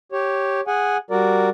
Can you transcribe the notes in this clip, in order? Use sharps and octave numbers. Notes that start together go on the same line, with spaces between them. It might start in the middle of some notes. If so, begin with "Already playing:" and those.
G4 C#5
G#4 F#5 G#5
G3 F#4 A#4 D5